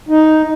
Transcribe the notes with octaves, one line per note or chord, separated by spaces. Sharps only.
D#4